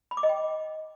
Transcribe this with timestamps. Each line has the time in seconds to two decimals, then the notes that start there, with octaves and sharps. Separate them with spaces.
0.11 B5
0.17 D6
0.23 D#5
0.29 G5